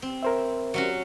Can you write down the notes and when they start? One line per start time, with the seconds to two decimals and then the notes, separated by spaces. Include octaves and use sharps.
0.02 C4
0.23 A#4 C5 E5
0.74 F#3 C#4 F#4